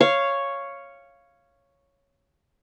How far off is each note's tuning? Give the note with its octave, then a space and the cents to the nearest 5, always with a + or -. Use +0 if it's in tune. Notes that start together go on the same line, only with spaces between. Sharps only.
C#5 +0 F5 -10